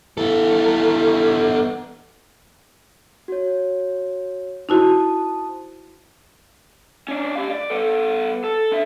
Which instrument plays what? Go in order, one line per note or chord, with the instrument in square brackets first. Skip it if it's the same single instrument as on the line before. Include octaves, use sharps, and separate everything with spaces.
[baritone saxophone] E3 [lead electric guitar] B3 A4
[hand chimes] F#4 C#5
[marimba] D#4 E4 F#4 [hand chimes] C5 A5 D#6
[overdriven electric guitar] C#4 D4
G4 F5
D5
B3 A4
A4
D4 E5